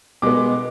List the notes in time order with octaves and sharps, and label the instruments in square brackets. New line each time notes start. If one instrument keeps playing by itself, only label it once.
[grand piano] B2 G#3 B3 D6